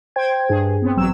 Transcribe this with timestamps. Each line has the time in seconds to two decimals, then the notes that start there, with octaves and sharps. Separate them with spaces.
0.16 C5 G5 G#6
0.49 G2 G#4
0.82 B3 C4
0.96 A1 F#3 C4 E6 E7